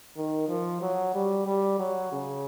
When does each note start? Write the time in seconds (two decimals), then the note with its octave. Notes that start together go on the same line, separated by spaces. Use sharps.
0.17 D#3
0.49 F3
0.82 F#3
1.14 G3
1.47 G3
1.79 F#3
2.12 C#3